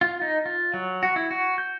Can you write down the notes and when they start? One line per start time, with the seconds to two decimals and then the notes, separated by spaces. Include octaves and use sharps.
0.01 F4
0.22 D#4
0.46 F4
0.74 F#3
1.03 F#4
1.16 E4
1.31 F#4
1.58 G6